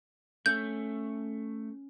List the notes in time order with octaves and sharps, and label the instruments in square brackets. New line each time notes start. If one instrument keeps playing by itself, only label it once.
[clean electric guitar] A3 [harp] C#4 [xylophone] G6